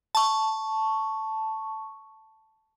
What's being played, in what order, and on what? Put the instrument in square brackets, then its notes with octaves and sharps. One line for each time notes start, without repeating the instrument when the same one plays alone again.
[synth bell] A5 C#6